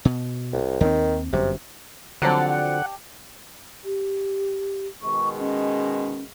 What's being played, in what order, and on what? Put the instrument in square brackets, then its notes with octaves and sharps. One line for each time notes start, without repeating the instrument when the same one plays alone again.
[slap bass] B2
[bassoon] C2
[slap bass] D#2 C4 [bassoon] D#3
[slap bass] G1 F#2 F#3 [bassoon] C3
[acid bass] D3 [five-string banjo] F3 F#3 C4 [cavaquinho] G4 D5 A5 [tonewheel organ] F#5
[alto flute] G4
[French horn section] B2 D#3 G#3 [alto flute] C#6
[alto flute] C#4